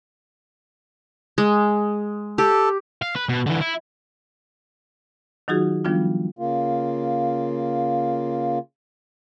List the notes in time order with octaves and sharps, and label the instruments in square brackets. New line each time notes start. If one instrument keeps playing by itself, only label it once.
[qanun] G#3
[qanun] G4 [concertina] A4
[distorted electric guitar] F5
B4
B2
D3 E3
E4
[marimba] D#3 F#3 D#4 F4 F#4 G#4
D#3 F3 G3 B3 D4 F4
[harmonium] C#3 A#3 F4